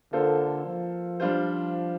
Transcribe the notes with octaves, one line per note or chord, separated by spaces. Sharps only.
D3 A#3 F4 A4 C5
F3
G3 D4 F4 C5